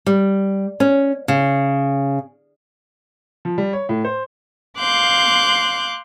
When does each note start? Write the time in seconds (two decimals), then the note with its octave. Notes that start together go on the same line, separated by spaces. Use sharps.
0.06 G3
0.80 C#4
1.28 C#3
3.45 F3
3.58 G3
3.73 C#5
3.89 A2
4.05 C5
4.78 F5 C6 D6 F#6 G6